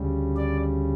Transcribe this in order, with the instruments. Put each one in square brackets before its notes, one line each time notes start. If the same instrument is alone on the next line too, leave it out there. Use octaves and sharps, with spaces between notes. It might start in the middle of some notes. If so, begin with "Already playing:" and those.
Already playing: [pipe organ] D2 C#3 G3
D5